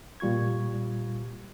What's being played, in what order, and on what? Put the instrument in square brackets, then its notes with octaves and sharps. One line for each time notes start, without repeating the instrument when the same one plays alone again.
[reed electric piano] A#2 G3 F4 C#6 G#6